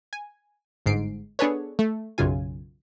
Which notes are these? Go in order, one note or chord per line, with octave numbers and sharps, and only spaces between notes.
G#5
G1 G#2 C7 D7
B3 D4 G#4 A4 B4 C#5
A3
B1 F#2 C#3 F4 G#5